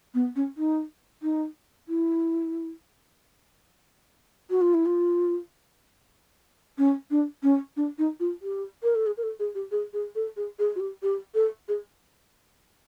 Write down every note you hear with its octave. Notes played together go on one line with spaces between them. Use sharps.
B3
C#4
D#4
D#4
E4
F#4
F4
E4
F4
C#4
D4
C#4
D4
D#4
F4
G4
A#4
A4
G#4
A#4
A4
G#4
G4
G#4
G#4
A4
G#4
G#4
F#4
G4
G4
A4
G#4